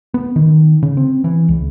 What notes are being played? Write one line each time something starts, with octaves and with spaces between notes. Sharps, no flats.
B3
D#3
C#3
C4
E3
C#2